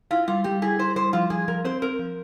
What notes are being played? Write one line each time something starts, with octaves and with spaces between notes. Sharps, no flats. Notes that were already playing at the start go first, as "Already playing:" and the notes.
E4 F4
G3 F4
G3 G4
E4 G#4
E4 C5
G3 C5
F3 F4
F3 G#4
F3 A#4
C4 C5
C4 A#4
F3